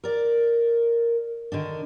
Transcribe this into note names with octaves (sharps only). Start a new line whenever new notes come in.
A#4 D5
D3 D#3 D4